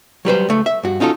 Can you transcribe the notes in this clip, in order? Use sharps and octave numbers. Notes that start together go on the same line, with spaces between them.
F#3 G3 B4 C5
C#2 A3
E5
G2 F#4
C#4 D#4 F4 F#4 A4